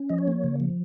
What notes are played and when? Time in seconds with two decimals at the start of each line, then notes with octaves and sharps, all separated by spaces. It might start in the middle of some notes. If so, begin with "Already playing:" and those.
Already playing: C#4
0.09 F3 D#5
0.18 C#5
0.28 A#3
0.44 C#3
0.60 F3